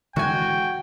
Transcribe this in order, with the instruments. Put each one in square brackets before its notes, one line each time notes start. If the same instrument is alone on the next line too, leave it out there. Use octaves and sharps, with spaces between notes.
[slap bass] D3 E3 G#3 [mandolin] F#4 G#5 [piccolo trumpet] G5